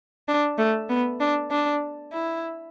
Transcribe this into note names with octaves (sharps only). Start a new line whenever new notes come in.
D4
A3
B3
D4
D4
E4